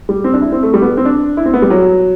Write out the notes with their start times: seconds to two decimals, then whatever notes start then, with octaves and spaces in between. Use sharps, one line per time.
0.09 G3
0.24 C4
0.33 D4
0.42 E4
0.52 C4
0.63 A3
0.74 G3
0.82 B3
0.97 C4
1.05 D4
1.37 E4
1.46 C4
1.54 B3
1.62 G3
1.70 F#3